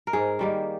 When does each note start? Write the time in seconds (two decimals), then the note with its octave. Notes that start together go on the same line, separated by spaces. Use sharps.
0.07 A#4
0.13 G#2 G#4
0.39 D#3 G3 A#3